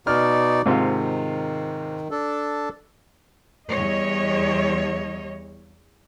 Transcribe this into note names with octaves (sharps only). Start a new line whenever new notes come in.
B2 D#4 D5 F6
G#2 C3 D#3 F4
D4 A4
E2 G3 C#5 D#5